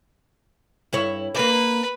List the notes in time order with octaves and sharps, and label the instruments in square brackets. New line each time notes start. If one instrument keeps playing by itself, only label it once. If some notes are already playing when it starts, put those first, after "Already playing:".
[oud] G2 E4 C#5
[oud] A#3 D5 [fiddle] B4